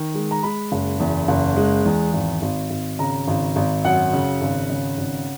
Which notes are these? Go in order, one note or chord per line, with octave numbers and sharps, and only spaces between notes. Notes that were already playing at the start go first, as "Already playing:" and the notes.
Already playing: D#3
G#3
A#5
G#3 B5
F#1
E2
F#1
G#3
E2
G#1
G#1
G#1
C#3 A#5
G#1
G#1
F#2 F#5
C#3
G#1
C#3
G#1